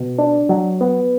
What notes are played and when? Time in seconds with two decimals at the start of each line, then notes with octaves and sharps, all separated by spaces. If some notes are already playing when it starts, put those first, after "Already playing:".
Already playing: B2
0.18 D4
0.49 F#3
0.81 B3